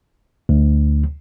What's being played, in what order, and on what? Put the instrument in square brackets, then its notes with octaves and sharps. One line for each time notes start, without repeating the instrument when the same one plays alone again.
[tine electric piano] D2